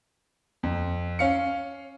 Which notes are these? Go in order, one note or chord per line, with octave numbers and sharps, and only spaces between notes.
F2
C#4 F5 C#7